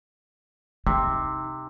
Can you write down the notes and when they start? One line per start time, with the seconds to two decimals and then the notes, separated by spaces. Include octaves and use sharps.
0.87 C3 D#4